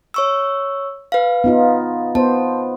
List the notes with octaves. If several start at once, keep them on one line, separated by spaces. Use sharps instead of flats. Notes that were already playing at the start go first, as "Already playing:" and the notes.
C#5 C#6 E6
B4 F5
B3 D#4 F4
B3 C5 A5